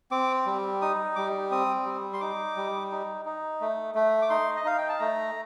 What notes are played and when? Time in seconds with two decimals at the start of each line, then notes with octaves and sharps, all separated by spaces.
0.11 C4 D6
0.46 G3
0.82 D#4 D#6
1.16 G3 D6
1.51 C4 D#6
1.86 G3
2.13 C6
2.21 D#4 D6
2.56 G3
2.91 D#4
3.25 D#4
3.61 A3
3.95 A3
4.22 D6
4.30 D#4 C6
4.56 D#5
4.65 D#4 F5
4.78 G5
4.89 A5
4.99 A3 A#5